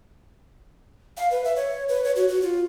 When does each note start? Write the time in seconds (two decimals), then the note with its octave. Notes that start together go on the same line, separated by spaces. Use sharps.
1.17 F5
1.31 B4
1.44 E5
1.56 C#5
1.89 B4
2.04 C#5
2.16 F#4
2.28 F#4
2.42 F4